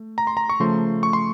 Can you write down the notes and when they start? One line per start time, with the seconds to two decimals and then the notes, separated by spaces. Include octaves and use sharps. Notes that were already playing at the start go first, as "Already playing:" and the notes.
Already playing: A3
0.18 A#5
0.27 C6
0.37 A#5
0.50 C#6
0.60 C#3 F3 A3 C6
1.03 C#6
1.13 C6